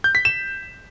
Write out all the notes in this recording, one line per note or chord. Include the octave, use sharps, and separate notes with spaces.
G6
B6
E7